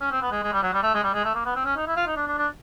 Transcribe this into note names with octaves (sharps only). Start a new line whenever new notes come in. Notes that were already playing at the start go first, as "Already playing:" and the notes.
C#4
C4
B3
G#3
G#3
G3
F#3
G3
A3
G#3
G3
G#3
A3
A#3
B3
C4
C#4
D#4
E4
F4
D#4
D4
D4
D4